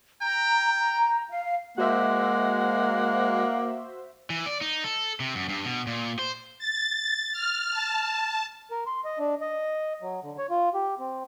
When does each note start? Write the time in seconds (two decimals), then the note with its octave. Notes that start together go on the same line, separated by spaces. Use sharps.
0.21 G5 A#5
0.76 A#5
1.30 F5
1.78 G#3 A#3 F#4 C5 E5 F#5
4.30 E3
4.46 D5
4.61 D#4
4.84 A4
5.20 C3
5.35 F#2
5.49 G2
5.65 B2
5.87 A#2
6.19 C5
6.59 A6
7.32 F6
7.71 A5
8.71 A#4
8.87 C6
9.05 D#5
9.19 D4
9.41 D#5
10.02 F#3
10.23 D3
10.38 C#5
10.50 F4
10.74 G4
10.99 C4